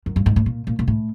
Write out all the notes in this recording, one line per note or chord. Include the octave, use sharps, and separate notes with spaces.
F#2
G2
G#2
A2
A#2
A#2
A#2
A2